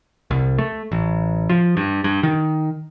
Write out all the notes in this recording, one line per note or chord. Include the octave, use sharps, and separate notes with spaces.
C2
A3
A1
F3
G2
G2
D#3